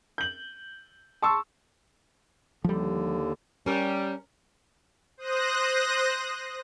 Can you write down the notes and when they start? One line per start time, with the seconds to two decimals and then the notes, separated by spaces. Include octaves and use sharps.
0.18 G6 F#7
1.22 A5 C6 C#6 E6
2.64 D#2 D3 F3 G3
3.66 G3 C#4 A#4
5.17 C5 D#6 F#6 A#6